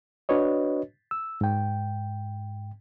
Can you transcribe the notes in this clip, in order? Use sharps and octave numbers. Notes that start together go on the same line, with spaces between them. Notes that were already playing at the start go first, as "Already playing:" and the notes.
D4 F#4 B4 C#5 D#5
E6
G#2 G5